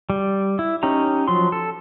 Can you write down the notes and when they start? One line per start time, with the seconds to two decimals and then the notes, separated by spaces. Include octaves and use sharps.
0.10 G3
0.59 E4
0.83 C#4 D#4 G4 A#5
1.28 F3 F#3 C6
1.52 A4